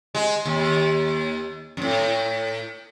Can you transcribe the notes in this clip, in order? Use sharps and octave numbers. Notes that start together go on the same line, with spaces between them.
G#3
D#2
F#2 A2